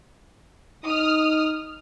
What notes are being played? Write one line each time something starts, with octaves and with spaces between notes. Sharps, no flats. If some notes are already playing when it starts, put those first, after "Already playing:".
D#4 D#6 F6